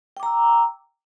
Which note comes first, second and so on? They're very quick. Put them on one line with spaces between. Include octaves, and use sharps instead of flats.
G5 D6 A#5 E6